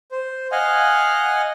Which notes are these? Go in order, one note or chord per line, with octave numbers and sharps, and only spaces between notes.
C5
D#5 F5 F#5 G#5